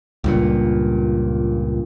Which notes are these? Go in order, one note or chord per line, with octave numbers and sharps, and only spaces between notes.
C#2 G2 A#2